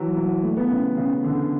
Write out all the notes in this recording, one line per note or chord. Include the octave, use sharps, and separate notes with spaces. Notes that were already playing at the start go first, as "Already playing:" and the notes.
Already playing: E3 F#3
F#3
A3
B3
C#3
C#3
D3